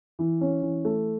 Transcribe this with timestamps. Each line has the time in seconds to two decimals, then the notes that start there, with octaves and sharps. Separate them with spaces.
0.19 E3
0.41 C#4
0.62 E3
0.85 A3